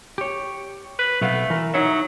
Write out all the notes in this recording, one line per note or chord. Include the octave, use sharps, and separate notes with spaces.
G4 C#5
B4
B1 A3 B3 F5
E3 A#4
F#3 D#4 C#5 E5